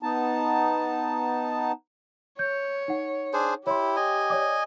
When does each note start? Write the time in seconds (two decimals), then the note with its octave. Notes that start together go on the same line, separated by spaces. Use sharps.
0.03 B3 D#4 A5
2.39 C#5 G6
2.88 D#4 F#5
3.33 D4 G#4 C5
3.67 E4 G4 C#5 C6
3.96 D#5 G#5
4.30 C#5 D5 D6